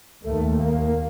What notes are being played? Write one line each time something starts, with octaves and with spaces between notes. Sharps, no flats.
D#2 A3
A#3